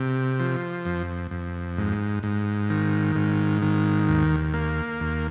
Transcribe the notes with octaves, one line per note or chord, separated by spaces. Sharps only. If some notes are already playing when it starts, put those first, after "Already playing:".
Already playing: C3
F3
F2
F2
G#2
G#2
D#3
G#2
D#3
D#2
A#3
D#2